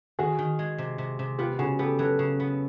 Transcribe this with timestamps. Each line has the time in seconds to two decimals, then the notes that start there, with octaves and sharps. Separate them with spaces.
0.19 D#3 F#4 G#4
0.39 D#3
0.59 G#3
0.78 C3
0.98 C3
1.19 C3
1.38 B3 F4 G4
1.59 C#3 F#4 G#4
1.79 B3 G4 A4
1.99 F#3 A4 B4
2.19 C#3
2.40 B3